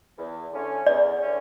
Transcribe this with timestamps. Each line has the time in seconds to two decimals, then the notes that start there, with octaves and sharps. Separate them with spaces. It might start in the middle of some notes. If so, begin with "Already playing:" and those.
0.18 E2
0.52 D3 A3 C#4
0.86 E2 D5
1.20 D3 A3 C#4